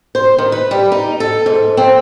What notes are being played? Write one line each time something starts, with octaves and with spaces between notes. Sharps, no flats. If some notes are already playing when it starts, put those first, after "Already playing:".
C5
D#3
B4
G3
D#4
A4
G#2
C4